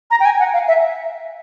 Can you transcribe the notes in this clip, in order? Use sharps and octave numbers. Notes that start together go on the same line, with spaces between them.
A#5
G5
G#5
F#5
F5
E5